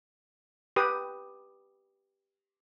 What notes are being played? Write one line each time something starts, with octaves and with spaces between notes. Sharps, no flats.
G4 B4 D#6